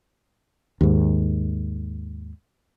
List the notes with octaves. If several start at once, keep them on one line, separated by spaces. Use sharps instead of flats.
D#2 G#2